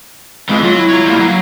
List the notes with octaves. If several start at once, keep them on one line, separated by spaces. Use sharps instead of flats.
F2 E3 G#3
F#3 F4
E4
C#5 A#5
G3 A#3
F#3